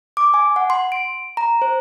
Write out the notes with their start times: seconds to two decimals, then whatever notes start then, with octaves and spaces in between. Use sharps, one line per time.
0.17 D6
0.34 G#5
0.56 F#5
0.70 C6
0.92 D7
1.37 A#5
1.62 C5